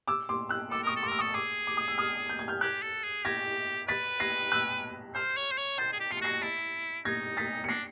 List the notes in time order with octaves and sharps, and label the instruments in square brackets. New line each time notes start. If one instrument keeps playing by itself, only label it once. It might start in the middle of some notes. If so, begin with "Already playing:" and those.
[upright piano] D6 E6
C6 D6
E6 F#6
[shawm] A4 [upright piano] D6 E6
[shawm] A#4 [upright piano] C#6 D#6
[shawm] A4
[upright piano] C6 D6
[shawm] A#4 [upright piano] E6
[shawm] A4 [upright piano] C#6 D#6
[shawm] G#4 [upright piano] D6 E6
[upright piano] D6
D#6
E6
D#6 F6
G6
G#6
F6 G6
[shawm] G4 [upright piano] F#6 G#6
[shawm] A4
G#4
[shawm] G4 [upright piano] G#6 A#6
[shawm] B4 [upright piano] A6 B6
[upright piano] A#6 C7
E6 F#6
[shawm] C5 [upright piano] F6 G6
[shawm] C#5
C5
C#5
[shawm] C5 [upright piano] G6 A6
[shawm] G#4
G4
[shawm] F4 [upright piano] C7
[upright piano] C#7
[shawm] F#4 [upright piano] A#6 C7
[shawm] E4 [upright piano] A6 B6
[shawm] D#4 [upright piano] G#6 A#6
[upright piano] A6 B6
C#7
[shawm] D4 [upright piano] A#6 C7